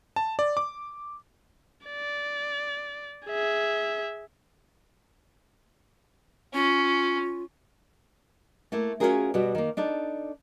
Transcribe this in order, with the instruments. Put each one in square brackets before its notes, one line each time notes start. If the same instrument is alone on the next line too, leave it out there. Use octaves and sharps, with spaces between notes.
[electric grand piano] A5
D5
D6
[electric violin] D5
G#4 E5
[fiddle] C#4 [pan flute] F4
[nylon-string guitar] A3 A#3 E4
C#4 D4 F4 F#4 G#4 A#4
B2 G3 F#4
D#3 A#3
D4 D#4 A4